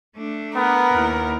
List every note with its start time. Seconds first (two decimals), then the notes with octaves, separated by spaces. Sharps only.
0.16 A3 D4
0.56 B3 A#4
0.92 D#2 E4